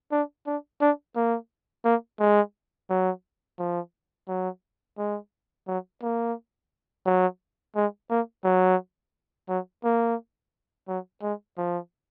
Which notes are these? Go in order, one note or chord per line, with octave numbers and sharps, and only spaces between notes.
D4
D4
D4
A#3
A#3
G#3
F#3
F3
F#3
G#3
F#3
A#3
F#3
G#3
A#3
F#3
F#3
A#3
F#3
G#3
F3